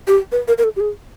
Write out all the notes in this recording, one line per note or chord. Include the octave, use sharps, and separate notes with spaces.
G4
B4
A#4
A#4
A4
G4
G#4